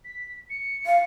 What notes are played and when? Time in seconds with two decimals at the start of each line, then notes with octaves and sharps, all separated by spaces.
0.04 B6
0.50 C#7
0.86 F5